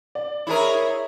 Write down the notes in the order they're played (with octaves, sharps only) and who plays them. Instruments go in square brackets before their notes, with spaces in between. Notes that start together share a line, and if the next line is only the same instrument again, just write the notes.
[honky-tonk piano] D5
[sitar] E4 G#4 A#4 [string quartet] C#5 E5